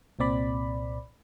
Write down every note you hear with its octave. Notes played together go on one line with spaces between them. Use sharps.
C2 A#2 C4 D5 B5